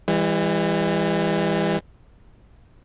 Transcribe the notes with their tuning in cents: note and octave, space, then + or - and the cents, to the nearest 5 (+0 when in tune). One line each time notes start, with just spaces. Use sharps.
E3 +5 G3 +45